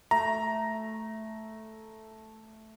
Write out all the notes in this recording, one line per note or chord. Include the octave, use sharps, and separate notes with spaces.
A3 A#5